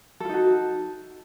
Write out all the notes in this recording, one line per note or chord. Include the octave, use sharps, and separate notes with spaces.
D#4 F4 F#4 A4